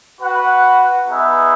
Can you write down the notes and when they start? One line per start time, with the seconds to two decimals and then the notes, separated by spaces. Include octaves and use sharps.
0.21 F#4 B4 F#5
1.08 B3 D#4 G#4 B4 E5